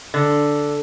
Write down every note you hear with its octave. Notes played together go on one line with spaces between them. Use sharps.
D3